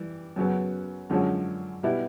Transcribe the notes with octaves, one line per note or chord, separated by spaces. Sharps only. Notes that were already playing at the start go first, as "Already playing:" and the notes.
Already playing: E3 G3
F#2 C#3 F#3 B3
F#2 D3 F3 G#3 C#4
B2 G3 B3 E4